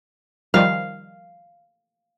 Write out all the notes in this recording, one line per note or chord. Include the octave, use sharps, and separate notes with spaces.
D#3 F3 G3 F5